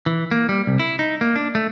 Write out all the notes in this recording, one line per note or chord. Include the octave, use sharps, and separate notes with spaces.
E3
A#3
G3
C2
E4
D#4
A#3
D4
A3